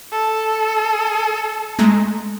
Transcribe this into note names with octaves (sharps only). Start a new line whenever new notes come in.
A4
G#3 A3 A#5